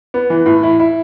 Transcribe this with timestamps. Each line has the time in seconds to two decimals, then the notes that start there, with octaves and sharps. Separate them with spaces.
0.14 B3
0.30 E3
0.46 A2
0.63 E4
0.80 E4